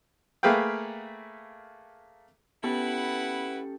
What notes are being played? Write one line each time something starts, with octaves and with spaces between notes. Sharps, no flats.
A3 A#3 G#4 B4 F5 G5
B3 C#4 E4 G4 A4 B4 F#5